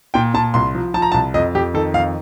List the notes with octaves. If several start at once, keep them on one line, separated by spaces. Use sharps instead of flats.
A#2 G5
A#2 A5
C2 C6
F3
F3 A5
A#5
C2 A5
F2 D#5
F2 G4
D#3 A4
F2 F5